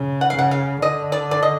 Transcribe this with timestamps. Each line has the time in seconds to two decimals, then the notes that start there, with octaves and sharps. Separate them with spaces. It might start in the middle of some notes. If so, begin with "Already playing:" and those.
Already playing: C#3
0.21 F#5
0.30 F5
0.37 C#3 F#5
0.51 F5
0.82 D3 D#5
1.12 D5
1.31 D5
1.43 D#5